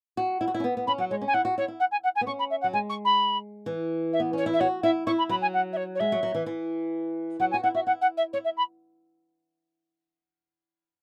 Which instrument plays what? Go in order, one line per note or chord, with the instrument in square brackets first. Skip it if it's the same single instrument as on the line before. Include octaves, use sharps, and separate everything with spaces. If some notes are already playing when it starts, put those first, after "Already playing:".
[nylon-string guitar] F#4
E4
F#4
E4
C#4
B3
B3
[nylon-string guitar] C#4 [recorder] B5
[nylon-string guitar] F#3 [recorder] F#5
[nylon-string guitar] G#3 [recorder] C#5
[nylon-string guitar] C#4
[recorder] G#5
[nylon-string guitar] E4 [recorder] F#5
[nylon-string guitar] F#4
[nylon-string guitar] E4 [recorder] C#5
[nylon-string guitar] E4
[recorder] F#5
G#5
F#5
G#5
[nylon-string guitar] B3
[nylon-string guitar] C#4 [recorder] C#6
[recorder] B5
E5
F#5
[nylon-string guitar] F#3
[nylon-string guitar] G#3 [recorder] G#5
[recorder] C#6
B5
[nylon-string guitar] E3
[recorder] E5
[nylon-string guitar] B3
[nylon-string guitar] C#4 [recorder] C#5
[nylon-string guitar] E4
[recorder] E5
[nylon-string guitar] F#4 [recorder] C#5
[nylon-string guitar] E4 [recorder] E5
[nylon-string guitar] E4 [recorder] C#6
[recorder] B5
[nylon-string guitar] F#3 [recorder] B5
[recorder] G#5
F#5
E5
C#5
C#5
[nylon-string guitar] G#3 [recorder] E5
[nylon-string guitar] F#3
F#3
E3
E3
[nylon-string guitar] F#3 [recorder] F#5
[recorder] G#5
[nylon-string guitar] F#4
[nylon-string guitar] E4 [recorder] F#5
[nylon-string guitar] F#4 [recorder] E5
[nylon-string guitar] E4 [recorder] F#5
[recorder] F#5
E5
[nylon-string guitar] E4 [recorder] C#5
[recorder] E5
B5